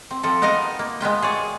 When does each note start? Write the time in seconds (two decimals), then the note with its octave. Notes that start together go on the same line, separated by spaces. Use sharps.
0.11 C4
0.23 F3 C4 A4
0.42 B3 D#4 A#4 D#5 F5 A#5
0.79 A#3
1.01 G#3 B3 F4 G5
1.22 G#4 C#5 D5